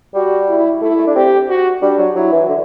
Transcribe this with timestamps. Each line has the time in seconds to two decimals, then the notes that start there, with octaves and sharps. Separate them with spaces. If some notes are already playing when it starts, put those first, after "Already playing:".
0.14 G3 F#4
0.48 E4
0.81 A3 E4
0.99 A3
1.07 D4
1.15 C4 G4
1.49 F#4
1.82 G3 D4
1.98 F#3
2.16 F#3 E4
2.32 E3
2.49 D3